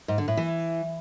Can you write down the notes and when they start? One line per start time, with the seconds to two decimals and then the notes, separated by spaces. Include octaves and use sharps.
0.08 G#2
0.18 D3
0.28 A2
0.37 E3